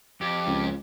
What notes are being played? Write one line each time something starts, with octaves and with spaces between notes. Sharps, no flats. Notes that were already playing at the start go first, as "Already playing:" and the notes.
F2 G4
C#2